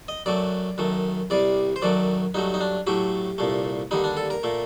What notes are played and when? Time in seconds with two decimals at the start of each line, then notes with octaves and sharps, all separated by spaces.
0.08 D#5
0.26 F#2 F#3 A3 D5
0.78 F#2 D#3 A3
1.30 C2 C3 G3 D5
1.76 C5
1.82 F#2 D#3 F#3 A3 D5
2.34 G2 F#3 A3 D#4
2.54 D#4
2.60 D4
2.87 A2 F#3 A3 G4
3.38 C2 A#2 A3
3.91 D#2 D3 G3 D#4
4.04 D4
4.17 A4
4.30 A#4
4.43 A#2 A3